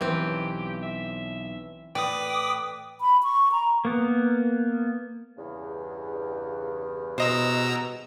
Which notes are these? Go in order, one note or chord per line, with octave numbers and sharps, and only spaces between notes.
B1 B2 E3 C4 G4
E5
A2 B4 D5 G5 D6 D#6
B5
C#6
A#5
A#3 B3
E2 G2 C#3
B2 C5 D#5 A#5 E6